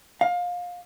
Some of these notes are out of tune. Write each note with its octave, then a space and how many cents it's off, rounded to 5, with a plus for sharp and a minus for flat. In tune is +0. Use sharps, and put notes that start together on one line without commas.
F5 +25